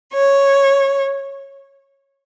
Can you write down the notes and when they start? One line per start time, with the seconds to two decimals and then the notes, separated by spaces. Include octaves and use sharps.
0.12 C#5